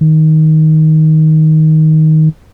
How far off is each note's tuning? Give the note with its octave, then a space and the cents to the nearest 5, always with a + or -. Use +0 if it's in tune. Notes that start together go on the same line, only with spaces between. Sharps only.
D#3 +10